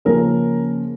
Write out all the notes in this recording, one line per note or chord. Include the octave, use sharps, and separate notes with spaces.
C#3 F3 A#3 C#4 A#4